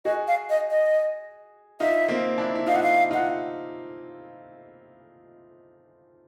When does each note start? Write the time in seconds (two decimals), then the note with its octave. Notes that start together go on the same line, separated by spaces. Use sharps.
0.05 F#4 G#4 D#5
0.28 F5
0.50 D#5
0.70 D#5
1.80 D#4 F4 E5
2.08 A#3 C4
2.38 D4 E4
2.55 E4
2.67 D#4 F4 F5
2.76 F#5
2.83 F5
3.11 D#4 F4 F#5